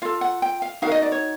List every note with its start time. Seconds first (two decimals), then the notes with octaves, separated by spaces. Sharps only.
0.02 F4 A4 F5
0.21 F#5
0.42 G5
0.62 F5
0.82 D#4 F#4 A#4 F5
0.92 D#5
1.02 D5
1.12 C#5